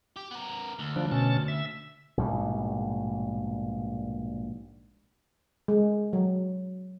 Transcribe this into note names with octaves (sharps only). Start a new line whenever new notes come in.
G4
B3 A#4
D2
F3 D4
B2 C#4 A5
E5
A#1 G#2 B2 G3
G#3
F#3